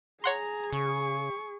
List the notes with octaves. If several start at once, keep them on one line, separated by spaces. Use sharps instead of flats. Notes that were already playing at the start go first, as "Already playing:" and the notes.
G#4 C#5 F#5 A#5 C6
C#3 C#6